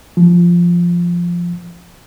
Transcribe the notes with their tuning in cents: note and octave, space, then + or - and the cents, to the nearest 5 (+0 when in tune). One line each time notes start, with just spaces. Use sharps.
F3 -5